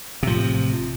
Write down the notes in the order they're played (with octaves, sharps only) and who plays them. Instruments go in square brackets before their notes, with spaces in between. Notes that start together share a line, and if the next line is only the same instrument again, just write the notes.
[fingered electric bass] A1 A2 [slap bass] C3 F3